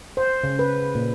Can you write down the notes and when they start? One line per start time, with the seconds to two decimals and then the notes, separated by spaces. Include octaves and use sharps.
0.17 C5
0.44 C#3
0.59 B4
0.95 A#2